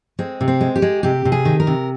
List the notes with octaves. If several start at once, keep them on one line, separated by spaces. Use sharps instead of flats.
G#3 C4
C3
C4
G#3
G4
G#3
C3 G4
C3
G#4
D#3
A#4
C3